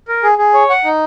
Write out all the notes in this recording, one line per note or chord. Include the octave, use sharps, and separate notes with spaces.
A#4
G#4
G#4
C#5
F#5
D#4